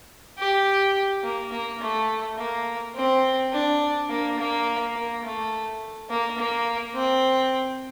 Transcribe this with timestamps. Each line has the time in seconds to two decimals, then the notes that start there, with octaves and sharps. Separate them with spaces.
0.38 G4
1.23 A#3
1.52 A#3
1.81 A3
2.37 A#3
2.95 C4
3.52 D4
4.09 A#3
4.38 A#3
4.95 A#3
5.24 A3
6.10 A#3
6.38 A#3
6.95 C4